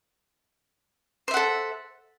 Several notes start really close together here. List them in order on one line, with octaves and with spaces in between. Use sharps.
C5 E5 F#5 A4